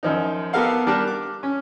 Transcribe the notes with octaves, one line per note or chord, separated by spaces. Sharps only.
F#2 F3 D#4
B3 G4 A4 A#4 F5 F#5
G3 D4 A#4 A5 F6 F#6
D6
C#4